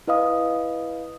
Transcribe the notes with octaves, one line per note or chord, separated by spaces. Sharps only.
E4 B4 D#5 F5 D#6